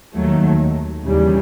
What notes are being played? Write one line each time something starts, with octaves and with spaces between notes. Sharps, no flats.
D#2 D#3 F#3 A3
D#2 C#3 E3 G3